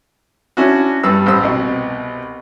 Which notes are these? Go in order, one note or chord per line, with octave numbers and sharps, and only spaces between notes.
C#4 D4 E4 F#4
G2 G3 B3 E6
A1 C5 E6
C2 B2